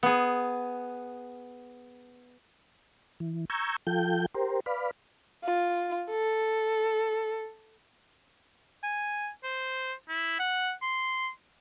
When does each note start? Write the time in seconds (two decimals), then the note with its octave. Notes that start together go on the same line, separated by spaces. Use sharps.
0.03 B3 G#4
3.20 E3
3.50 A#5 C#6 E6 G6 G#6
3.87 F3 F4 A4 G5 G6
4.35 G4 A#4 C5
4.66 B4 D5 F5 B5
5.44 F4
6.10 A4
8.83 G#5
9.43 C5
10.08 E4
10.39 F#5
10.82 C6